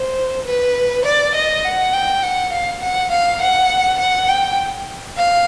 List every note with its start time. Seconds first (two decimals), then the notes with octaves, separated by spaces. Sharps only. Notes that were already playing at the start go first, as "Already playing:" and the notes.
Already playing: C5
0.46 B4
1.05 D5
1.35 D#5
1.65 F#5
1.93 G5
2.22 F#5
2.52 F5
2.82 F#5
3.11 F5
3.41 F#5
3.99 F#5
4.29 G5
5.17 F5